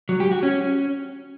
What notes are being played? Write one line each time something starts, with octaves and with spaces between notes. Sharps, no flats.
F#3
G4
F#4
C#4